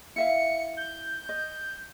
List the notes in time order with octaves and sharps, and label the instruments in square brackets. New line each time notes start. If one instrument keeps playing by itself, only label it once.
[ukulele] E4 E5 F5 [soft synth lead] C#7
[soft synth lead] G6
[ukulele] D#5